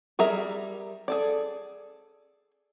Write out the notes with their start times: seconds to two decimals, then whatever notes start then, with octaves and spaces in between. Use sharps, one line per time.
0.19 G3 G#4 A#4 E5 A#5
1.08 G#4 A4 D5